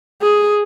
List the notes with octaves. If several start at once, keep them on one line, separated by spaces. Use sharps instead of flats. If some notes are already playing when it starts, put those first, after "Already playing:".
G#4